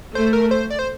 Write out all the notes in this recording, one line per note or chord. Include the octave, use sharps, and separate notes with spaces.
A3 C5
A#4
C5
D5
C5